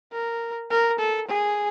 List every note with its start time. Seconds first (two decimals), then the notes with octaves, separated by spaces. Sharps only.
0.12 A#4
0.70 A#4
0.99 A4
1.27 G#4